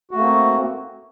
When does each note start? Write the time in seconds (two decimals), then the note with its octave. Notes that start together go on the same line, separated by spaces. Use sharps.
0.11 F#4
0.14 A3
0.18 A#3
0.21 C4